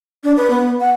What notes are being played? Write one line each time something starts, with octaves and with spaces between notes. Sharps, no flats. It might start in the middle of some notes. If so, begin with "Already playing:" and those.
D4
B4
B3
F#5